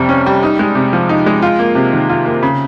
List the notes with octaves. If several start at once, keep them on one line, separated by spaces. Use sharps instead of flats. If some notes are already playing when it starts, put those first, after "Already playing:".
Already playing: F2 C3 G3
C#4
G3
D#4
G#3
C3
F3
D#4
G#3
F4
A#3
C3
D#3
F4
A#3
C#3